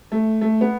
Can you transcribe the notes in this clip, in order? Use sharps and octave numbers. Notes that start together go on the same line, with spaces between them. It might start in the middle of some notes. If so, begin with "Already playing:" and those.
A3
A3
B3